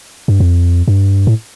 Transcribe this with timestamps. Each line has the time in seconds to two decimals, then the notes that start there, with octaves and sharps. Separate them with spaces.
0.28 G2
0.40 F2
0.88 G2
1.27 A2